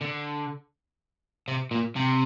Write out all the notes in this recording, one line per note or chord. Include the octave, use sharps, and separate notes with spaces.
D3
C3
A#2
C3